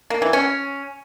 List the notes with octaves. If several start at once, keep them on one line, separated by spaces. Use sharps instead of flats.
A#3
E3
C#4